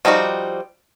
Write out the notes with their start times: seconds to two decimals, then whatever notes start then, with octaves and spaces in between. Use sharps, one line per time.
0.05 F3 G3 D#4 E4 F#4